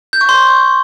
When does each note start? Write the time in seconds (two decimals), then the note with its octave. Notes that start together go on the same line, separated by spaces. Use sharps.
0.13 G6
0.21 C#6
0.29 C6